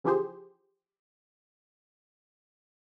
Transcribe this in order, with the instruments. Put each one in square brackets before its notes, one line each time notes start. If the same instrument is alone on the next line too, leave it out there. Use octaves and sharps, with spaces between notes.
[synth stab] C#3 E3 F3 G4 G#4 C5